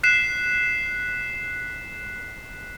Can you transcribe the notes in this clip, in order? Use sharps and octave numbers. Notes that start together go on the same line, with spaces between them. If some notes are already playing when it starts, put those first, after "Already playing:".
F#6 B6 C7 E7